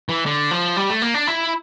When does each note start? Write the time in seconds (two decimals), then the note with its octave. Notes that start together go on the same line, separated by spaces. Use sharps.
0.09 E3
0.26 D3
0.51 F3
0.77 G3
0.90 A3
1.02 A#3
1.14 D4
1.27 E4